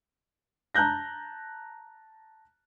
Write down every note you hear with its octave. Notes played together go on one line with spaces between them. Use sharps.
A5 A#5 F#6 G6 A#6